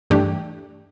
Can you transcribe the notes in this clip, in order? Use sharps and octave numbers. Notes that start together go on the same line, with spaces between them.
G2 E3 A3 D4 G4